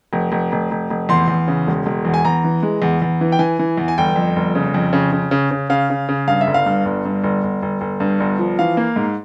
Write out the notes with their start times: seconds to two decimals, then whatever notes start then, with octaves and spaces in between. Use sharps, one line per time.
0.13 F1
0.32 F1
0.52 F1
0.71 F1
0.90 F1
1.09 E2 C6
1.28 E2
1.48 C#3
1.67 E1
1.86 E1
2.05 E2
2.14 G#5
2.25 E2 A#5
2.44 E3
2.63 G#3
2.82 E2
3.02 E2
3.21 E3
3.32 G5
3.39 E3 G#5
3.59 E3
3.77 E2
3.88 G#5
3.98 G1 G5
4.16 F2
4.36 G1
4.55 C#3
4.74 F2
4.93 C#3
5.12 C#3
5.31 C#3
5.51 C#3
5.70 C#3 F5
5.90 C#3
6.09 C#3
6.28 G2 F5
6.41 E5
6.47 G1
6.54 F5
6.66 G2
6.85 G1
7.05 G2
7.23 G1
7.43 G1
7.62 G1
7.81 G1
8.00 G2
8.20 G1
8.39 F3
8.59 E3 F5
8.77 A#3
8.96 G#2